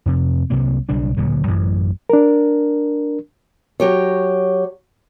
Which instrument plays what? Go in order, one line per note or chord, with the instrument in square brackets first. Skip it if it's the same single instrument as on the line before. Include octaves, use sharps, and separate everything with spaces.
[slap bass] F2 C3
C2 C3 F#3 A#3
B1 C#3 G3 D4
D1 A#2 D3 F#3
A1 F#2 E3
[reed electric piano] D4 A#4
[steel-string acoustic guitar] F#3 G4 C#5